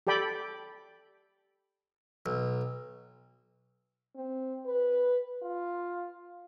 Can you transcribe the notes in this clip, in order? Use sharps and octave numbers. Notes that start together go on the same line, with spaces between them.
G4 A4 D5 G5 B5
B1
C4
B4
F4